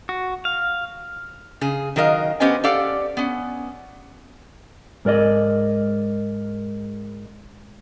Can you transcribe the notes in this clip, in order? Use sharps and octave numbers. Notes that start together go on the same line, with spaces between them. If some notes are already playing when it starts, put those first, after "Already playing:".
F#4
F5
C#3 G#4
D#3 F#3 A#4 D#5 F5
B3 C#4 G4 C5 D#5 G#5
G4 A4 D5 F5 F#5
B3 C#4
G#2 A#4 D5 D#5